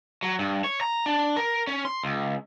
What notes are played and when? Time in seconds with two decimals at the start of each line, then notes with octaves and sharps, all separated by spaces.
0.23 F#3
0.39 G2
0.64 C#5
0.81 A#5
1.06 D4
1.36 A#4
1.67 C#4
1.85 C6
2.04 C#2